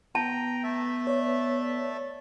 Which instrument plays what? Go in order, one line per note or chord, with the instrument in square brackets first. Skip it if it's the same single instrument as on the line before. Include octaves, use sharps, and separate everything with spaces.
[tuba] B3 [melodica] G5 A#5 [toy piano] A5
[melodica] A3 A4 E5
[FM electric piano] C#5 D5